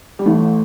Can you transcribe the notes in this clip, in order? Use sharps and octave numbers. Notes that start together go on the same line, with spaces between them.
G3
A1 A2 A3